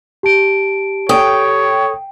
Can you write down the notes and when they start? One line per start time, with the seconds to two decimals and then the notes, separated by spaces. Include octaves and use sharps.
0.23 G4 A5 D7
1.09 A4 C#5 G5 D#6